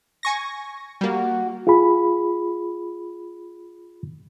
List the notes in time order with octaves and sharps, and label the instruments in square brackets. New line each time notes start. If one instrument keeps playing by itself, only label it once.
[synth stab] G#5 C#6 A#6
[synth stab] G3 A#3 [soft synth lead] F#4
[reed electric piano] F4 G#4 B5